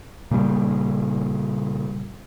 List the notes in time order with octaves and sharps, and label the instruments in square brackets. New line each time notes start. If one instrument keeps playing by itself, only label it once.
[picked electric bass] A#2 C#3 G3